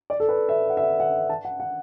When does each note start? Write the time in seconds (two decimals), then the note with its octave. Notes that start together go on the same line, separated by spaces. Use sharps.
0.10 D5
0.20 A4
0.29 B4
0.49 E5
0.70 F#5
0.77 E5
0.84 F#5
1.00 F#5
1.29 A5
1.45 F#5
1.60 F#5